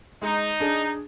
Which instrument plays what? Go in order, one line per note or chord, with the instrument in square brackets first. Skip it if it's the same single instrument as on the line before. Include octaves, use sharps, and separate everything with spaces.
[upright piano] G#3 [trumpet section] D#4
[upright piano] D4 G#4